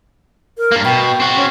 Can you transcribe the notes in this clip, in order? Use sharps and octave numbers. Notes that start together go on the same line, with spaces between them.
A#4
G2 A#3
B2 G5
C4 F#4
C#4